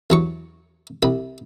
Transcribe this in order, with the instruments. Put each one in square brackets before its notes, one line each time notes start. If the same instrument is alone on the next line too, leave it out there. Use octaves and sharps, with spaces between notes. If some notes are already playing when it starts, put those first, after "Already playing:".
[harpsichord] E2 F#3 C#6
C2 B5